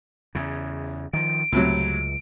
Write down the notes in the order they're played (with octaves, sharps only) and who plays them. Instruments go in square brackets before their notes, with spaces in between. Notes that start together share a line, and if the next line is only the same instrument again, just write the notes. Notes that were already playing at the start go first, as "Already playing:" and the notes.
[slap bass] E2 C#3
[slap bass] D#3 F3 [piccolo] D7
[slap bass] C#2 [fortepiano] A2 C3 F#3